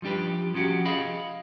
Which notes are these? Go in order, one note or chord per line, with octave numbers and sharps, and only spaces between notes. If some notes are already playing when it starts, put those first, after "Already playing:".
F3 G3 D4 G4 B4
F3 C#4 F#4 G4
G#4 D#5 F5 B5